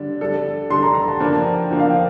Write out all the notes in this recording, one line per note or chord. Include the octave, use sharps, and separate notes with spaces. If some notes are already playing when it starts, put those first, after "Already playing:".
Already playing: D3 G3 D4
D3 G3 D4 A4
D3 G3 D4 A4 C6
A#5
A#5
A5
D3 F3 A#3 D4 A5
G5
D3 F3 A#3 D4 G5
F5
G5